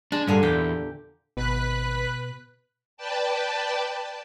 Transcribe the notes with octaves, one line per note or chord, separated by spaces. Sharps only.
G#3 D4
G2 A#2 D3 G#4
E2 G4
G#1 B2 B4 F#6 B6
B4 D5 G5 A5